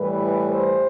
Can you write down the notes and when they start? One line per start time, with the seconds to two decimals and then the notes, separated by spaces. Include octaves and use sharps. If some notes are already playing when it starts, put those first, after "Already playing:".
Already playing: A2 E3 G3 B4
0.52 C5